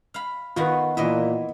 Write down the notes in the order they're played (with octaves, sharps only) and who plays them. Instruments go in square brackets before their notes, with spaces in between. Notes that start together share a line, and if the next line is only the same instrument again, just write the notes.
[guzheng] F5 B5
[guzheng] D#3 B3 F#4 [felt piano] F4 B4
[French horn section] A#2 [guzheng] E3 D#5 E5 [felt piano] E4